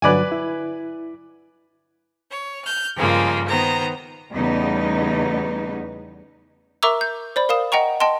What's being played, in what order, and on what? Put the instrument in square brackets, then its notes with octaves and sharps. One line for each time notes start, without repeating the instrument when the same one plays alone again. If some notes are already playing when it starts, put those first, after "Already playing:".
[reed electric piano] G2 D3 F#3 [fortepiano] B4 D5 G#5
[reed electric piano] E4
[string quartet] C#5
F6 G6
G2 C#3 F3 G#3 A#3
D#3 B3 C5 A#5
[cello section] E2 C#3 G3 A3 B3 D#4
[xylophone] A#4 E5 A#5 C#6 D6 E6
G6
C5 D5 B5
A#4 F5 D#6 E7
D#5 F#5 G5 A#5 C#6
D#5 G5 A5 C6